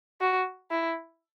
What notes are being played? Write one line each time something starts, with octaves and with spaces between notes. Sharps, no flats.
F#4
E4